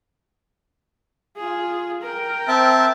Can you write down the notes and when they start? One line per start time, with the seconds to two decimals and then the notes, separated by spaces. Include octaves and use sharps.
1.37 F4 G#4
2.02 A#4 G5
2.48 C4 E5 A5